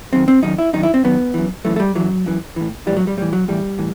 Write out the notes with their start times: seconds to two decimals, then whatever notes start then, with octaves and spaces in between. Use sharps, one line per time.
0.13 F#2 D#3 C4
0.28 C4
0.43 F#2 D#3 D#4
0.58 E4
0.73 F#2 D#3 D#4
0.83 E4
0.94 C4
1.04 F#2 D#3 B3
1.34 F#2 E3
1.65 F#2 E3 A3
1.76 A3
1.80 G3
1.95 F#2 E3 F#3
2.26 F#2 E3
2.56 A2 E3
2.87 E3 G3
2.90 A2
2.97 F#3
3.07 G3
3.17 A2 E3 G3
3.33 F#3
3.48 A2 E3 G3
3.78 A2 E3